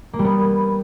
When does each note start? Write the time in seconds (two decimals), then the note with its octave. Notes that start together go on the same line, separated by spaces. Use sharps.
0.13 A#3
0.19 G3
0.25 B3